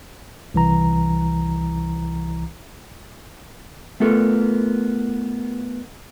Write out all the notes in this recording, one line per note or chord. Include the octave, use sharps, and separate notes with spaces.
C2 E3 A#5
A3 B3 F4 A4 A#4